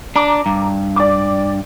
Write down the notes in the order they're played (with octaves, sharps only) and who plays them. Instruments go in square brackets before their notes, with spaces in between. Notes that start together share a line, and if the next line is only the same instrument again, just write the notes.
[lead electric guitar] D4 [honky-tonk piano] A#5 D6
[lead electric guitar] G2
[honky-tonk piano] D5 D6